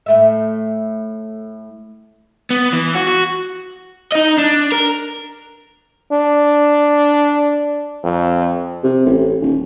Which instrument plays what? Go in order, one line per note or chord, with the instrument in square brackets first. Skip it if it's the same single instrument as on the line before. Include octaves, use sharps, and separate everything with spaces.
[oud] A2 A3 E5
[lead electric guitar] B3
E3
F#4
F#4
[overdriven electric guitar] D#4 D#5
D4
A#4
[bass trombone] D4
F2
[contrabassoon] C3
A1
D#1